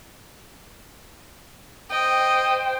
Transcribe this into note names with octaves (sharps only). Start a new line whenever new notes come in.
C5 D#5 G5